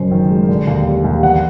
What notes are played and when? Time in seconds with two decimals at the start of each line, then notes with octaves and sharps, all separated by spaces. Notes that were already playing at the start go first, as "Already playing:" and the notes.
Already playing: F#1 F#2 C5
0.11 D#3
0.30 G#3
0.48 D3
0.67 D#2
0.86 G3
1.04 D#2
1.23 E2 F#5